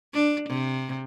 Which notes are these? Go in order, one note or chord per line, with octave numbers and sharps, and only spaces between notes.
D4
C3